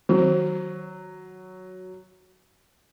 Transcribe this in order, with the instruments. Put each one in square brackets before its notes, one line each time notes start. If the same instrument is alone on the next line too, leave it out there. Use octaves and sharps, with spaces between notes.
[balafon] D#3 [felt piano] F#3